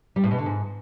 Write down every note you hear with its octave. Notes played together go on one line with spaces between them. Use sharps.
G3
A2
B2
D3
G#2